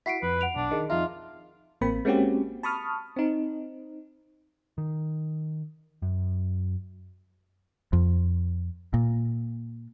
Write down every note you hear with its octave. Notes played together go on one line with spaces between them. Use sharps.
E4 F#4 B6 C7 D7
F2 B4
F#5 D7 F7
B1 D4
D#3 G#4 D#5
F2 D#4 F4 E5
A1 A#3 C4 B5
G#3 A#3 C4 C#4 F#4 G4
A5 B5 C#6 D#6 F6
C4 D#4
D#3
F#2
F2
A#2